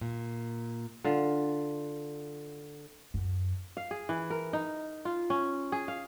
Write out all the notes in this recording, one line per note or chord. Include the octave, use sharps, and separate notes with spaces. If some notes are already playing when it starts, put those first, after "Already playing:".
A#2
D3 F4
F#2
F5
G#4
E3
A#4
D#4
F4
C#4
G#4
F5